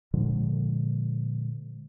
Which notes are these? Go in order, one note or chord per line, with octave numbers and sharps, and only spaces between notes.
A#2 D3 F3 G#3